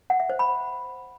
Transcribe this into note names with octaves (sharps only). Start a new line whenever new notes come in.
F#5
E5
C5
B5